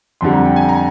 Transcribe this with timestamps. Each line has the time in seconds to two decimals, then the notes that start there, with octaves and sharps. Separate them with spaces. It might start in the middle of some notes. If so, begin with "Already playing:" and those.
0.21 F2 D3 G3 C6
0.34 A#5
0.45 G5
0.56 G#5
0.69 A#5